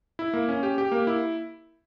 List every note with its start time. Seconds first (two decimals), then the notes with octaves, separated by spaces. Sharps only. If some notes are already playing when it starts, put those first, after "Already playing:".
0.19 E4
0.34 A#3
0.48 C#4
0.63 G4
0.78 G4
0.92 A#3
1.07 E4